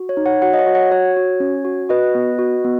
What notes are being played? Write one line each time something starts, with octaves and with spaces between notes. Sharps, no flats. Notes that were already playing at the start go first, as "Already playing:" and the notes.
Already playing: F#4
C#5
D#4
C#5 F#5
F#4 C#5 F#5
D#5
C#5 F#5
F#4
C#5 F#5
F#4 C#5
F#4
C#4
F#4
F#4 B4 D#5
B3
F#4
B3